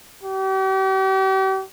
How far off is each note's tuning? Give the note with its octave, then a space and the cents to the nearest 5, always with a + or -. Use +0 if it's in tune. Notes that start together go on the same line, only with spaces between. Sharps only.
G4 -40